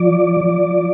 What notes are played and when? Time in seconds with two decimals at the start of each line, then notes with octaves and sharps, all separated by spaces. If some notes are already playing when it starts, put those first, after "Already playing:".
Already playing: F3 D5
0.41 F3